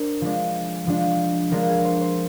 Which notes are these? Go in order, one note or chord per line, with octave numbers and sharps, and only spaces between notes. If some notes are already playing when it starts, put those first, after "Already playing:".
Already playing: D4 A#4 C5
F3 G#3 D4
F3 G#3 D4
F3 G#3 D4 A#4
G#4
C5
C5